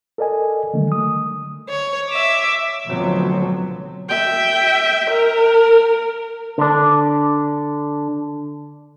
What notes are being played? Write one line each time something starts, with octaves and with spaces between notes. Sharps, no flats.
A4 A#4 D5 D#5 G#5
D3 D#3 F#3 G3 A3
D#6
C#5
E5 D6
D2 B2 D3 F3 F#3 C4
E5 G5
A#4
D3 D4